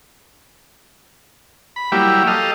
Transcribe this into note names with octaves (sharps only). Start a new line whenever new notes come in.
B5
F#3 G3 A#3 E4 G4
G4 A4 D#5 F5